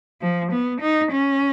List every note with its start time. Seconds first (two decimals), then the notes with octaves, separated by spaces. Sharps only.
0.21 F3
0.51 B3
0.81 D#4
1.11 C#4